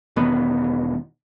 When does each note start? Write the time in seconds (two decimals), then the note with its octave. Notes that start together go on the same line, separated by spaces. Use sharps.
0.16 E1 D#3 B3